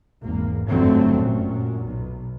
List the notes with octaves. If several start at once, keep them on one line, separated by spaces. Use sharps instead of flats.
G#1 E2 A#3
G1 F2 D3 F#3 A3 C4
F#2 A#2
B1